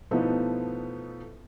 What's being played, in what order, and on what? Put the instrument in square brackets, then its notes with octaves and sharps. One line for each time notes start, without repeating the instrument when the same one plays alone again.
[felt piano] B2 F3 A3 B3 D#4 E4